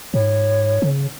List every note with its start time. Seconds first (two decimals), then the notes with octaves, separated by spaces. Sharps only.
0.14 G#2 C#5
0.82 C#3